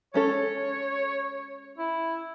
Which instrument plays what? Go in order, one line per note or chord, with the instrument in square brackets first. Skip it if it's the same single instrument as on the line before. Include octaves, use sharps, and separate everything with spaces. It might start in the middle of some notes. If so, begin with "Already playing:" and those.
[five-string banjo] G#3 C#4 A4 [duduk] C#5
[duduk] E4